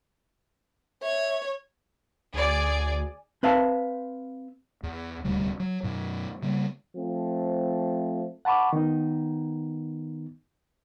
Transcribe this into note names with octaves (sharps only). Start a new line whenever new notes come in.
C#5 E5
D2 G#4 D5
C4 B4 E5 F5 A5
E2
D#1 D2 C3 G3
F#3
F#2 B2 F#3
C#3 G3 A#3
F3 A3 C4
F#5 A5 B5 C#6 D6
D#3 B3 D#4